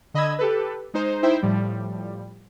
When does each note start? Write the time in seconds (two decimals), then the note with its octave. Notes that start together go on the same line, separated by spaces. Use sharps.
0.14 D3 D#5 B5 D#6 E6 G#6
0.39 G4 A4 B4
0.94 G#3 D#4 C5
1.22 D#4 E4 C5 E5 G5
1.43 A2 F3 G3